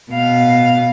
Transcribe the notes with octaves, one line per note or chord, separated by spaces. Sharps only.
B2 F5